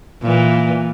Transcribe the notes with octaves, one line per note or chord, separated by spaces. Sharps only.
A#2 E3